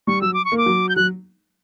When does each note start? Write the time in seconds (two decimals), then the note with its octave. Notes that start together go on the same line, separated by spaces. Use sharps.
0.07 G3 C#6
0.22 F#3 E6
0.34 D6
0.45 C#6
0.52 A#3
0.58 D6
0.66 F#3
0.89 G6
0.96 F#3 F#6